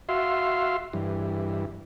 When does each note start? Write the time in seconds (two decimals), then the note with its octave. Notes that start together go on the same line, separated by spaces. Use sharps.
0.09 F#4 E5 F5 C6
0.93 G2 E3